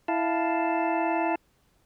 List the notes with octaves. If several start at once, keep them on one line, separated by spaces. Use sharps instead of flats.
E4 F5 A5